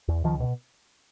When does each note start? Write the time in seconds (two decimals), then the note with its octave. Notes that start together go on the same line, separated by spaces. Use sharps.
0.08 E2
0.24 C#2 D#3 F3
0.40 B2